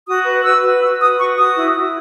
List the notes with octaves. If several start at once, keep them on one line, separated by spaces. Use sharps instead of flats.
F#4 D#6
B4
B4 E6
F#4
F#4 E6
B4 D#6
F#4 C#6
F#4 D#6
E4
E4